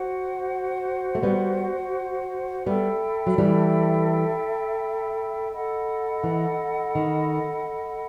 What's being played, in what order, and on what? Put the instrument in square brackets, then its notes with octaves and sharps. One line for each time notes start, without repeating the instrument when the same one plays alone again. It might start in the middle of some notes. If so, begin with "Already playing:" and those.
Already playing: [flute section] F#4 C5 F#5
[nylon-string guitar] A3
G3 B3
[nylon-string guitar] G3 B3 [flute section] A4 E5 G5 B5
[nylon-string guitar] F#3
E3 G3
[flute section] A4 D#5 F#5 B5
[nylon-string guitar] E3
D#3